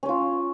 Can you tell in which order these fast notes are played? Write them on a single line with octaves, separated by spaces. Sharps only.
C#4 C#5 F4